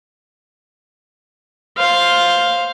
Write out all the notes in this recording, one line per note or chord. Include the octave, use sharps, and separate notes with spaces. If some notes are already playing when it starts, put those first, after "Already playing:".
C5 F5